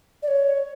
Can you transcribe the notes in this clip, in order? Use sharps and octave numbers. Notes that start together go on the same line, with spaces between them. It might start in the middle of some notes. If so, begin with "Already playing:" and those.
D5
C#5